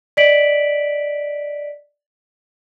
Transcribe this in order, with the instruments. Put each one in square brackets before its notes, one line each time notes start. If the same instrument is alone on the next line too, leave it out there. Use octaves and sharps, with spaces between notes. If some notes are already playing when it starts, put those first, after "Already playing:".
[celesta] D5 D#5 B6 D7 F#7